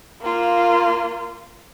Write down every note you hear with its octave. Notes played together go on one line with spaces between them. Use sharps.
A#3 F4